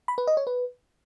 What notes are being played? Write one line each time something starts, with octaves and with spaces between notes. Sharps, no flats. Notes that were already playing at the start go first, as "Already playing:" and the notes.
B5
B4
D#5
C#5
B4